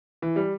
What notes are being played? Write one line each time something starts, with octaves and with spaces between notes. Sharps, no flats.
E3
G3